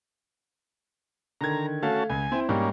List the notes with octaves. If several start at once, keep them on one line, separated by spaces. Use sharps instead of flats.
D3 D#3 A#5 G#6
A3 C#4 F#4 F5 A5
C#2 G#5
C4 E4
G#2 G3 A#3 C#4